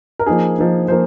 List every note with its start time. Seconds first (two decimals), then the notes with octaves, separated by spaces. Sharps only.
0.19 A#4
0.26 F3 A#3 D#4 G#4
0.58 F3 A#3 D#4
0.88 F3 A#3 C5